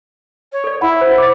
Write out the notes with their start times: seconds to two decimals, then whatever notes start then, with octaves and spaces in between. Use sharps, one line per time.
0.52 C#5
0.64 A4 D5
0.81 E4 F#5 B5
1.01 C5
1.18 D6 A6